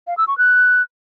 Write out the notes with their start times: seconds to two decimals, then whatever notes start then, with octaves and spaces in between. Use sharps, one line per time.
0.07 F5
0.17 E6
0.28 C#6
0.38 F#6